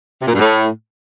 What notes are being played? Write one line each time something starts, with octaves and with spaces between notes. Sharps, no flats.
C3
A#2
G2
A2